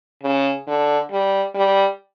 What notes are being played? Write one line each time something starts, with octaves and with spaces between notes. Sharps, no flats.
C#3
D3
G3
G3